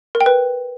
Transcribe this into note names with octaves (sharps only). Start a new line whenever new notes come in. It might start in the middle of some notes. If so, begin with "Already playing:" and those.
A#4
G5
B4